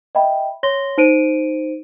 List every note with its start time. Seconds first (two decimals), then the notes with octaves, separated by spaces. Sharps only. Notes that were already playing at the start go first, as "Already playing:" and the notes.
0.15 D#5 E5 G5 B5
0.63 C#5 C6 A#6 G7
0.98 D#4 C5 D7 D#7